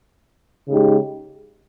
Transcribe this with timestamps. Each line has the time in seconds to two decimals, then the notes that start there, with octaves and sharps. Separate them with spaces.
0.68 C#3 G#3 D#4 G4